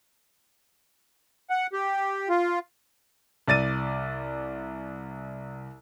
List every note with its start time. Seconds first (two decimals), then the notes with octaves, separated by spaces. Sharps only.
1.50 F#5
1.73 G4
2.29 F4
3.48 C2 D5 A6 D#7